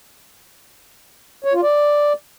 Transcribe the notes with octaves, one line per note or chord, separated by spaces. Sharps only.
C#5
F4
D5